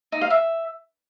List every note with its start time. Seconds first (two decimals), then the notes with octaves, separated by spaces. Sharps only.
0.12 D#4
0.21 F5
0.30 E5